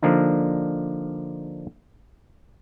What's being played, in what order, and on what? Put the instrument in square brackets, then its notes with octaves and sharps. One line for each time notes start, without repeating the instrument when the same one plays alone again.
[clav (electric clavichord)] D3 F3 A#3 D4 D#4